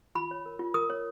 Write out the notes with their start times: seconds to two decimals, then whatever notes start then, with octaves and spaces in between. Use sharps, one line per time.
0.15 F4 B5
0.31 C#5
0.46 A#4
0.59 F4
0.74 A#4 D#6
0.90 C#5